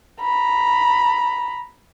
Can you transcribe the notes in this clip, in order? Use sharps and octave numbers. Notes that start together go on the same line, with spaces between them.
A#5 B5